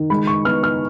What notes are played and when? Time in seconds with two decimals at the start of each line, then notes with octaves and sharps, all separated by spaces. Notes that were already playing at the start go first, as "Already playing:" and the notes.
Already playing: D#3
0.10 G#3 B5
0.27 C#6
0.45 B3 F6
0.64 F6